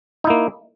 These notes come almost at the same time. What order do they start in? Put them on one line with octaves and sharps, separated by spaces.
D#4 E4 A#3